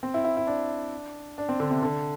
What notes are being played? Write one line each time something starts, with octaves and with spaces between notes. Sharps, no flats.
C4
E4
E4
E4
D4
D4
C4
D3
C3
D3